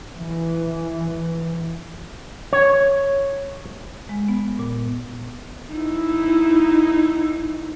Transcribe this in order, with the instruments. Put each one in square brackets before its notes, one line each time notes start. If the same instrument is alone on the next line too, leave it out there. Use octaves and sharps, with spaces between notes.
[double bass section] E3
[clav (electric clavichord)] C#5
[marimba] G#3
B3
A#2
[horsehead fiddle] D#4 E4